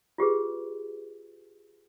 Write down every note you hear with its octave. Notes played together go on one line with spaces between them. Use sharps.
F4 G4 G#4 B4